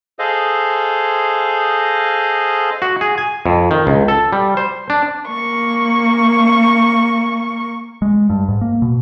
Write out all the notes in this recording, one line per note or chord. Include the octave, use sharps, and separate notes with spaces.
G#4 A4 C5 D#5 F5
F#4
G#4
G#5
F2
D#3
C#2
A4
G3
C5
D4
A#3 C#6
G#3
G2
G#2
A#3
B2